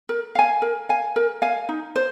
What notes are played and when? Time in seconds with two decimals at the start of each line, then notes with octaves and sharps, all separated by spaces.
0.09 A#4
0.35 F5 G#5
0.62 A#4
0.89 F5 G#5
1.16 A#4
1.42 F5 G#5
1.69 D#4
1.96 C5